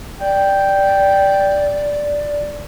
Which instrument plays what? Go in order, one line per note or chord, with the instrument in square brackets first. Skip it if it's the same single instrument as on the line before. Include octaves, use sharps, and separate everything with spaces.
[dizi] D5 [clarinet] G5